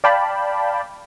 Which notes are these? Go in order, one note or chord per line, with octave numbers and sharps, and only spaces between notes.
D5 F5 G5 A5 B5